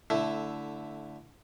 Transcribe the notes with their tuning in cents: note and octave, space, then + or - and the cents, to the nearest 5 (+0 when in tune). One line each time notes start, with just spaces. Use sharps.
D3 -15 A3 +0 E4 +0